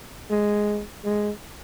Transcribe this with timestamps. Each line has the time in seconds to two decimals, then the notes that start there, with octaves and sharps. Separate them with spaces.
0.31 G#3
1.04 G#3